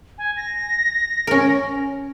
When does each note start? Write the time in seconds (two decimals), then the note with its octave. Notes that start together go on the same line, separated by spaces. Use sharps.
0.18 G#5
0.37 A#6
1.27 C#4 A#4